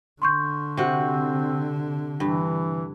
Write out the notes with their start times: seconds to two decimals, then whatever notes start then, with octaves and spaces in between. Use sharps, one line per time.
0.22 D3 C6 C#6 G6
0.77 C3 C4 F#4
2.20 G2 E3